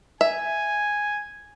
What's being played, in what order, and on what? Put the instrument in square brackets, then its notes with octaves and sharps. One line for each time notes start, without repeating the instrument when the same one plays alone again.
[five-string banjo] E5 [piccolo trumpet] G#5